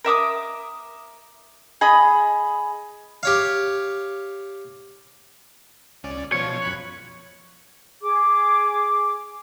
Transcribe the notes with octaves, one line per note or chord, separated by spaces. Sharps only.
A#4 E5 D6 D#6
G#4 D#5 B5 D#6
G4 C#5 F5
C#2 C#4 D5
B2 F3 F4 C#5
F#2 B5 F#6
G#4 D6